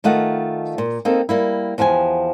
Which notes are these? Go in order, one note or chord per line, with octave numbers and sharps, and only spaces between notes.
D#3 A3 F4 D#5 F#5
A#2
A#3 C4 D#4 A4
G3 A#3 E4
E2 F3 G4 F5 G#5